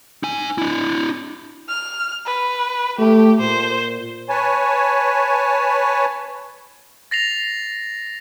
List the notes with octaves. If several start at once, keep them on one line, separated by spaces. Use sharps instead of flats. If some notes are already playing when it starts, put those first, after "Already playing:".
D#4 G#5
D4 E4
F6
B4
A3 G4
A#2 C5
B4 C#5 G#5 A5
A6 A#6 C7 F7